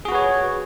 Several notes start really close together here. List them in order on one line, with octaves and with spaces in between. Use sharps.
G#4 F#4 B4 C#5